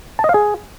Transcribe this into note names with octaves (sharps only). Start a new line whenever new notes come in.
A5
D#5
F5
G#4